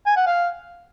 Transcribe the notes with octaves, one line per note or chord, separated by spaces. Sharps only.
G#5
F#5
F5